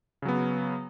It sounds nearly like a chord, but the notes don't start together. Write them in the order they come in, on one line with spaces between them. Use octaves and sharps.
C#3 F#3 B3